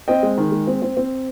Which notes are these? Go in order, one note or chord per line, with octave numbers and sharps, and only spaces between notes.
C4 D#5 G5
G#3
D#3
G#3
C4
C4
C4